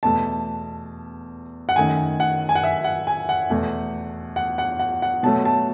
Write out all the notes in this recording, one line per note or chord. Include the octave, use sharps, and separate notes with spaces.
E2 B2 A3 A5
F#5
F#2 D#3 A3 G#5
F#5
G#5
F#5
E5
F#5
G#5
F#5
E2 B2 A3
F#5
F#5
F#5
F#5
B2 F#3 A3 A5
A5